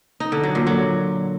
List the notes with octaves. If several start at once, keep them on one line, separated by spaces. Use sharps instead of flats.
D#4
D3
F#3
A#2
F#3